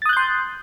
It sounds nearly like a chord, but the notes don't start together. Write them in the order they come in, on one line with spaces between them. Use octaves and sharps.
A6 D#6 F#6 G6 C6